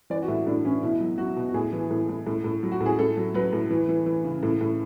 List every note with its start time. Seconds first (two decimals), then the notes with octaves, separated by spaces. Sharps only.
0.10 E3 D5
0.22 F#4
0.28 A2 E4
0.47 A2 D4
0.65 E3 C#4
0.83 B2 E4
1.00 F#3
1.18 F#3 F#4
1.36 B2
1.49 F#4
1.54 A2 G#4
1.73 E3
1.91 A2
2.09 A2
2.27 A2
2.44 A2
2.63 F#3
2.72 F#4
2.81 A2
2.86 G#4
2.99 A2 A4
3.17 F#3
3.34 F#3 B4
3.53 A2
3.70 E3
3.89 E3
4.06 E3
4.24 C#3
4.43 A2
4.61 A2